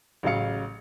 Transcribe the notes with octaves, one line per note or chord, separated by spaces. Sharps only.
A1 C#3 F#3 F5 C#7